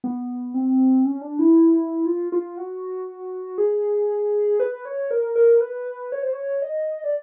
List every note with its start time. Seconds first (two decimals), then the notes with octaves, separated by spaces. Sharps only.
0.04 B3
0.54 C4
1.05 C#4
1.21 D4
1.39 E4
2.06 F4
2.32 F4
2.57 F#4
3.58 G#4
4.60 B4
4.85 C#5
5.11 A#4
5.36 A#4
5.61 B4
6.12 C#5
6.22 C5
6.33 C#5
6.62 D#5
7.04 D5